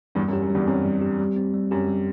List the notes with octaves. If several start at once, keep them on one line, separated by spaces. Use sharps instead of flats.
E2 G2 G3
F#2
G4
F#2
E2 G2 G3
F#2 C4
G3
G4
G3
C4
G3
F#2 G4
G3